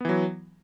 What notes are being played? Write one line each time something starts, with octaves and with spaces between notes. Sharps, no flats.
E3 F#3 B3